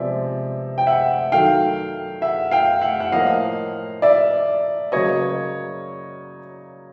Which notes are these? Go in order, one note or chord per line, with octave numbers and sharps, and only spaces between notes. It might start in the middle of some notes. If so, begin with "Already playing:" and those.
Already playing: C3 F3 G#3 B3 D5 E5
G5
E5 F#5
D#3 F#3 A3 F5 G5
E5 F#5
F5 G5
E5 F#5
F#5
A2 F3 A#3 D#5 F5
D5 E5
C#3 F#3 A#3 C#5 D#5